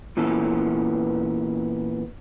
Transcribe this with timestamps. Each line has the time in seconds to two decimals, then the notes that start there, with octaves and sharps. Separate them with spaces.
0.17 A#2 E3 B3 C#4 A4